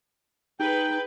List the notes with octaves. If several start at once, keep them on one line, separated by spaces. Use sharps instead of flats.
D#4 G#4 B4 G5